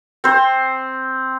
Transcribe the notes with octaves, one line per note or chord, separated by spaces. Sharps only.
C4 C5